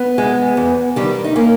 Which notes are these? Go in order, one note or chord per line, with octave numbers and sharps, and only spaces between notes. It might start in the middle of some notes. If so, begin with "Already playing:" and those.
Already playing: B3
G#3
E2
D#3 G3
D#4
A#3 C#4